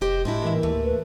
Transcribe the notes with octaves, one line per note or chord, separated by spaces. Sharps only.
F1 G4 C5 D#5
A2 G#3 D4 E4 F#4
E3 A#3 A#4 E5
D2 A3
B4